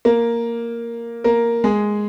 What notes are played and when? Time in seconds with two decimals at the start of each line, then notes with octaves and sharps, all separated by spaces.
0.05 A#3 A#4
1.24 A#3 A#4
1.64 G#3 G#4